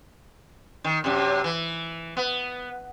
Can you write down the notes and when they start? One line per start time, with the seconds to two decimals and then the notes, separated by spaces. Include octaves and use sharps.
0.84 D#3
1.04 F#2 C3
1.44 E3
2.17 B3